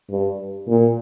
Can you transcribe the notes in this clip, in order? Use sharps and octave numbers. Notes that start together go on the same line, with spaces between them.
G2
A#2